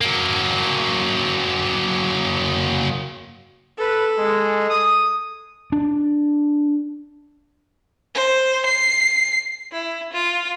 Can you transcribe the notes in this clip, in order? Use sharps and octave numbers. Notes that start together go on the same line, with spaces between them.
F#3 A#3
A4 B4
G#3
D#6
D4
C5
C7
E4
F4